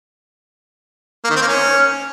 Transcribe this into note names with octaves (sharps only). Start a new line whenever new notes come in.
A#3
D#3
C4
A#3
C#4